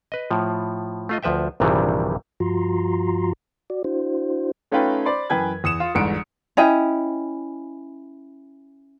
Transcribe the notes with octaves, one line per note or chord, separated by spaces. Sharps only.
B4 D#5
A2 F3
A3 F4 D#5
D2 F3 B4 E5 G5
A#1 G2 C3 D#3 E3 G3
G2 F3 F4 F#4 A#5 C6
F#4 D5
D4 E4 F#4 C5
A3 C#4 D#4 F4 B4 G5
C5 D5 B5 C6
F#2 E3 B4 G5 G#5 G#6
E2 D#6 C#7 E7
F4
G1 E2 G#2 C#7 D7
C#4 E4 D#5 G5